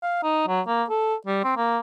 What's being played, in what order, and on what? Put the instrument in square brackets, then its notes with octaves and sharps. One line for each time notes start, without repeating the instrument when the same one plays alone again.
[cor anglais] F5
D#4
F#3
A#3
A4
G3
C4
A#3